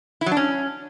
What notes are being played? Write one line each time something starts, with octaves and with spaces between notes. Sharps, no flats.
E4
F#3
D4
C#4